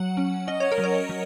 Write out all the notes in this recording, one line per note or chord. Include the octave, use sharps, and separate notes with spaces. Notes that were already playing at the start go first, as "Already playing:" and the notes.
Already playing: F#3 F#5
C#4
C#4 D#5
C#5
A#4
F#3
C#5
F#3